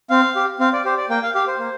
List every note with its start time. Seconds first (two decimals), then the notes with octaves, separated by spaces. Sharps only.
0.10 C4 F5
0.36 G4
0.59 C4 F5
0.73 D5
0.85 G4 C5
0.97 D5
1.09 A#3 G5
1.23 F5
1.34 G4 F5
1.47 C5
1.59 A#3